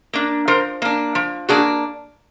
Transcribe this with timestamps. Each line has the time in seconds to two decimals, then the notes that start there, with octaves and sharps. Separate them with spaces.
0.13 A#3 D4
0.48 F3 A#4 C5
0.82 A#3 D4
1.15 F3
1.49 A#3 D4 F#4 G#4